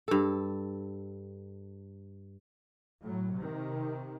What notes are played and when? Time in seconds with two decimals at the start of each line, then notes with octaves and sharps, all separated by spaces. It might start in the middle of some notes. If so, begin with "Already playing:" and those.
0.08 G2 A4
3.03 A2 F#3
3.37 C3 D#3